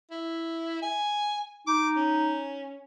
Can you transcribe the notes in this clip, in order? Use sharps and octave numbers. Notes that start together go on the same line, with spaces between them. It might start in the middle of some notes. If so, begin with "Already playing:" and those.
E4
G#5
D#4 D6
C#4